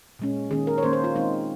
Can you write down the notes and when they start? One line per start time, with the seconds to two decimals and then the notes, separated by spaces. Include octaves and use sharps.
0.19 A#2 G#3 C#4
0.51 D#3 A#3 C#4 G#4
0.67 A#4
0.78 C#5
0.83 D#3 A#3 C#4 C5
0.93 C5
1.04 F4
1.16 D#3 G#3 C4 D#4